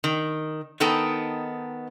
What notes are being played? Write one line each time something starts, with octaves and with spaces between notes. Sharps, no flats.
D#3
D#3 B3 D#4 A4 G5